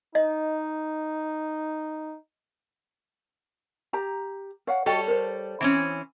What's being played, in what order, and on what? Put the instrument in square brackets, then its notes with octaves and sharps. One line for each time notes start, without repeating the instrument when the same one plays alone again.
[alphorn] D#4 [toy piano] D#5
[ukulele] G4 A#5
C#5 F5 F#5
[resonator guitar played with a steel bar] G3 A4 C#5 [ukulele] F#4 D#5 G5
[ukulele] A#4 C5
[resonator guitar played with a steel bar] E3 C4 C#4